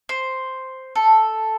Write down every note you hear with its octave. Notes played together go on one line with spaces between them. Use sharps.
C5
A4